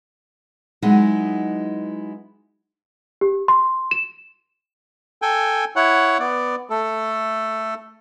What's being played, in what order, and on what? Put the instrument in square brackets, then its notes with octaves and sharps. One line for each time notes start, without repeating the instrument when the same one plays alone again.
[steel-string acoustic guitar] F#3 G#3 B3 D#4 E4
[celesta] G4
C6
E7
[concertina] A4 G5 G#5
E4 C#5 F#5
B3 D5
A3 A4